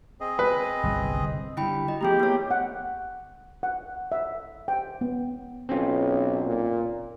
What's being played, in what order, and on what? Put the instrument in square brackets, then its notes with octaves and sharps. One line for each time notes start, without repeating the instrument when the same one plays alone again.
[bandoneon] C4 G#4 D#5
[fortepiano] B4
[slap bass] G1 C2
[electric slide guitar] D3 G3 [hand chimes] E4 G5 B5
[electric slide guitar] F#4 [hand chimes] D#5
[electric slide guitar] F3 E4 A#5 [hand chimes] A3 B3 G#4 [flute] G4
[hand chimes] A#3 C#5 [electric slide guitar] B3
[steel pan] F#5
F#5
E5
G5
B3
[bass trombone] B1 [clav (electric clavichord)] C4 C#4 F4
[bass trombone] A#2